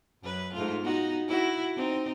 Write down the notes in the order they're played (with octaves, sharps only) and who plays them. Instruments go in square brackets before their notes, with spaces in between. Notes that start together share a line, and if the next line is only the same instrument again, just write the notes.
[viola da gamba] F#2 B4
G#2 A3 F4
B3 D#4 F#4
E4 F#4
C4 D#4